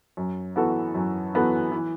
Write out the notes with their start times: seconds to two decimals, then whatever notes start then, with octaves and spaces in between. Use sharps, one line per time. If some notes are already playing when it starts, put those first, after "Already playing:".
0.17 F#2
0.56 E3 B3 F#4 A4
0.95 F#2
1.34 E3 B3 F#4 A4
1.71 E3